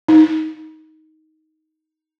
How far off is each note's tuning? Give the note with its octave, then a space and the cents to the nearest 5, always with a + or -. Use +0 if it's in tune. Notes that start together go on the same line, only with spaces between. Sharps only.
D#4 +10